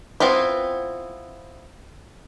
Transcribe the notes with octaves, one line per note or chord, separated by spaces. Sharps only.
B3 C4 E4 F4 B4